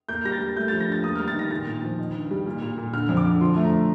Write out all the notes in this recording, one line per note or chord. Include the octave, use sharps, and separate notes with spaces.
A#3 G6
G3 A#6
A6
G3
A3 G6
F3 A6
A#6
G2 A6
A#3 D#6
G3 F6
A6
D#3 A#6
A#2 A6
A#2
F3
D#3
G2
G3
A#2
A#2
A#2
D3 F6
F2
D6
D3
F3 C6
A3
A#5